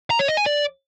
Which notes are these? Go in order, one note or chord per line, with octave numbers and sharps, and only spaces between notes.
A#5
C#5
D#5
G#5
D5